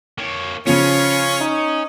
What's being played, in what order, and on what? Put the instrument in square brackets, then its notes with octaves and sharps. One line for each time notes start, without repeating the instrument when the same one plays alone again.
[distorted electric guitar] A#3 C#5
[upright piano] C#3 F3 [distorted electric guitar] C#4 [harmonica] F4 C#5
[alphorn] D#4